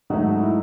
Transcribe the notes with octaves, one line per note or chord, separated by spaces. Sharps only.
G#2 F#3 A3 D#4 F#4
E4